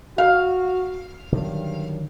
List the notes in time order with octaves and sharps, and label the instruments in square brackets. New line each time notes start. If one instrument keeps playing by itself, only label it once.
[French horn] F#4 [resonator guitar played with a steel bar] F5
[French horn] G2 [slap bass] D3 D#3 F#3